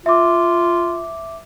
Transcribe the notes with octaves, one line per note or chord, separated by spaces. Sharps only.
F4 E5 D6